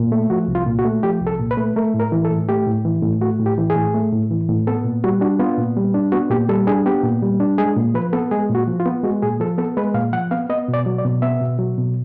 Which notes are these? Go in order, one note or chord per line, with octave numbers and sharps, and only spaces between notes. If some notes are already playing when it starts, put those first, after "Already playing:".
Already playing: A#2
A3
F3 F#4
C2
F4
A#2
F#4
A3
F3 G4
C2
A4
A#2
B4
A3
A3 A#4
A2
A#4
E3
A4
A2
A3 G4
A2
E3
A2
A3 F#4
A2
G4
E3
G#4
A2
A3
A2
E3
A2
B3 A4
A#2
G3 F#4
D4 F#4
B3 F4
A#2
G3
D4
B3 F#4
A#2 G4
G3 A4
D4 G#4
B3 G4
A#2
G3
D4
G#3 G#4
A#2
F3 B4
B3 A4
G#3 G#4
A#2
F#4
F3
F4
B3
G#3 F#4
A#2 G#4
F3 A4
B3 A4
G#3 B4
A#2 F5
F3 F#5
B3 F5
B3 D#5
B2
D5
F#3
D5
B2
B3 E5
B2
F#3
B2